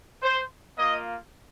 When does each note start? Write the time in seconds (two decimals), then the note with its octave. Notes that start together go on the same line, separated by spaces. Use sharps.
0.23 C5
0.78 A#3 F4 D#5